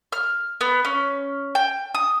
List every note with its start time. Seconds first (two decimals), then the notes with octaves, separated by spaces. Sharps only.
0.12 F6
0.61 B3
0.85 C#4
1.55 G5
1.94 D#6